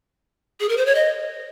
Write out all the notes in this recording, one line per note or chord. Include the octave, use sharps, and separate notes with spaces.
G#4
A#4
C5
C#5
D#5